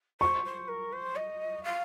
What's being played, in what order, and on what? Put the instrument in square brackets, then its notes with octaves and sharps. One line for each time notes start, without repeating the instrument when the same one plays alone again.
[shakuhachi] C5 [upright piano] C#6
[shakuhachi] C5
A#4
C5
D#5
F5